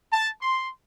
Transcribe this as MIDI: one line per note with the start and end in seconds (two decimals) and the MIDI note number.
0.12 0.30 81
0.41 0.69 84